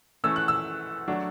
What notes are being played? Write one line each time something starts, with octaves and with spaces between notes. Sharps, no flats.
E3 A3 C#4 E6
F#6
E6
F#3 A3 D4